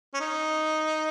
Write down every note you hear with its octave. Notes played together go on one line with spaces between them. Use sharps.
C#4
D#4